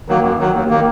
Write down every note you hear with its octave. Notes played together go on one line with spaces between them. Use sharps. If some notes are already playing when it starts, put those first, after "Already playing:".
D#3 F#3 A#3
F#2
D#3 F#3
D#2
D#3 A#3